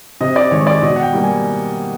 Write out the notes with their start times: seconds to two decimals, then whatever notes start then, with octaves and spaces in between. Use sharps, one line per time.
0.21 C3 D#5
0.36 D5
0.51 D#3 G#3 C#5
0.67 D5
0.82 B2 D#5
0.96 F#5
1.03 G5
1.13 G3 A#3
1.23 G#5